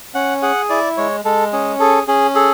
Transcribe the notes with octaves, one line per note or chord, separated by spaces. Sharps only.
C#4 F#5
G#4 F#5
E4 D5
G#3 C#5
G#3 A4
C#4 G#4
G#4 A4
C#4 G#4
G#4 A4